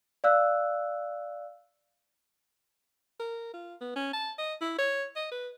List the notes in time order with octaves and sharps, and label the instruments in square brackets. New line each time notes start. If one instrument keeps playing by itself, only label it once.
[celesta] D5 F5 E6 F#6
[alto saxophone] A#4
F4
B3
C#4
A5
D#5
E4
C#5
D#5
B4